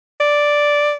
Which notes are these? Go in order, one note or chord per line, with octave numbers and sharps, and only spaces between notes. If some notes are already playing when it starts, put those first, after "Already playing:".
D5